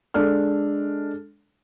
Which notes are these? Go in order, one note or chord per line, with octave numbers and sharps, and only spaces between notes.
G#3 D4 A4 F6